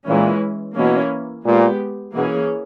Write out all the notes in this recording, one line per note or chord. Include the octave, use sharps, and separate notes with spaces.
A#2 E3 G#3 C#4 E4
B2 E3 A#3 C#4 E4
A#2 G#3 B3 G4
B2 E3 A#3 C#4 G#4